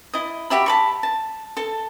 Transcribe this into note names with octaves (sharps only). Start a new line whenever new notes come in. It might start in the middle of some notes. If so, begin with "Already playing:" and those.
E4 D#5
F#4 G4 E5 B5
A5 B5 C#6
A5
A4 A5